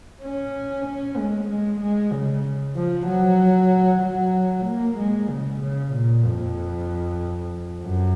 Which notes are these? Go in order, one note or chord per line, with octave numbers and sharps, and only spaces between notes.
C#4
C#4
G#3
G#3
G#3
C#3
F3
F#3
F#3
A#3
G#3
C#3
C#3
A#2
F2
F#2